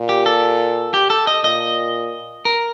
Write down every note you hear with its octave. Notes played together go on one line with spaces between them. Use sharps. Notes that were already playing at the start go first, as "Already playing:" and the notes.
Already playing: A#2
G4
A4
G4
A4
D#5
A#2 D#5
A#4